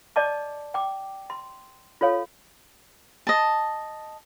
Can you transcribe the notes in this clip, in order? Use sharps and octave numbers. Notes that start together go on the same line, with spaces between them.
D5 D#5 A5 D6
G5 D6
C6
F4 A4 C#5 F5
D#5 A5